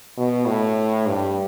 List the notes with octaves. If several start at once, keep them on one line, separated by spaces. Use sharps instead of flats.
B2
A2
G2